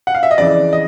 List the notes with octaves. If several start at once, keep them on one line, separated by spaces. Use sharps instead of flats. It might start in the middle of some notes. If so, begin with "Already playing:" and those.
F#5
F5
E5
D#5
F2 C#3 E3 D5
D#5